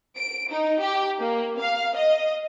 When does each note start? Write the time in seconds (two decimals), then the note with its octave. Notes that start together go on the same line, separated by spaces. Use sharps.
0.17 D7
0.51 D#4
0.80 G4
1.19 A#3
1.59 F5
1.95 D#5